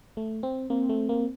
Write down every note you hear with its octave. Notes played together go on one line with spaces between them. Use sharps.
A3
C4
A#3 C4
A3
A#3